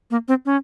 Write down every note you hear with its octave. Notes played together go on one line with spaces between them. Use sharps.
A#3
C4
C#4